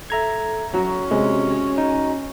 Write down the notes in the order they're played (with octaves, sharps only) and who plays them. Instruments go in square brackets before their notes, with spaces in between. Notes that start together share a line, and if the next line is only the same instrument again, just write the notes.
[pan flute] A4 [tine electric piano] E5 A#5 G#6
[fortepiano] F#3 [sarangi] C#4 [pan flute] F#4 [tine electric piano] A#5
[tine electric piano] C3 [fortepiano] G#3
[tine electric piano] D#4